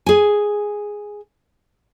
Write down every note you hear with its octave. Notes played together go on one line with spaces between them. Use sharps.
G#4 G#5